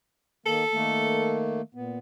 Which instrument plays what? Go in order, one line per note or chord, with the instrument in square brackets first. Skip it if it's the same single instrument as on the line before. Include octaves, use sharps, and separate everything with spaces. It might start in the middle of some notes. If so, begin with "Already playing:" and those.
[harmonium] D#3 A#3 [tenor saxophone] A4
[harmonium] D#3 A3 A#3
A#2 B3